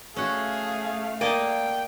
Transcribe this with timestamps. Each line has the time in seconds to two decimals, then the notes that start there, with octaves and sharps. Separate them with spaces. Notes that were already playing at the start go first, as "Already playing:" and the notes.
0.16 A3 C#4 F#4 G#4 F5
1.21 A#3 D5 D#5 G5 A5